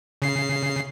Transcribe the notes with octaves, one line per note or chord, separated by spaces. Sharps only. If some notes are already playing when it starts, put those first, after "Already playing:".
C#3 C7